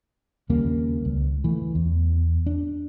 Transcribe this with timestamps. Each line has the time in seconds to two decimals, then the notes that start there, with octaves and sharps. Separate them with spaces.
0.50 D#2 C#3 G3 A#3
1.05 C#2
1.44 E3 A3
1.75 E2
2.46 D4